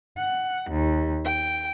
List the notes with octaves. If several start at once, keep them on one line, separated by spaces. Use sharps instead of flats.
F#5
D#2
G5